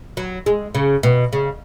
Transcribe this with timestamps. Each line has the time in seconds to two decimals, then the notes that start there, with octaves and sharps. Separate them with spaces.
0.17 F#3
0.46 G#3
0.75 C#3
1.03 B2
1.33 C#3